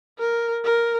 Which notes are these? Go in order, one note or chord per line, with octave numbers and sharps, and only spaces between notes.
A#4
A#4